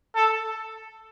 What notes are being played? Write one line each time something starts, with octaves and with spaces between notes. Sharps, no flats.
A4